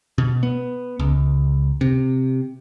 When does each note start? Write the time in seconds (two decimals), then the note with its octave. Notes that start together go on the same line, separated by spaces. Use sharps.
0.18 B2
0.43 B3
1.00 C#2
1.81 C3